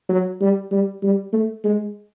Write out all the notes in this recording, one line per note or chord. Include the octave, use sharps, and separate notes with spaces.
F#3
G3
G3
G3
A3
G#3